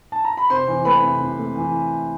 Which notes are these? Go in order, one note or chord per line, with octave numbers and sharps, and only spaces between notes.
A5
A#5
B5
C3 C5 C6
E3
A3 B4 B5
C3
C3
A3
E3